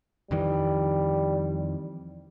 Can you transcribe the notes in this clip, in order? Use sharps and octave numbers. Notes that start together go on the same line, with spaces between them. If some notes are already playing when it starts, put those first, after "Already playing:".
F2 D#3 E3 G3